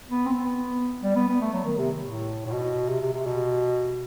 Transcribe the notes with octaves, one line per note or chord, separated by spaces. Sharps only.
B3
C4
B3
G3
B3
B3
A3
F#3
D#3
C3
A2
A2
B2
C3
C3
C3
B2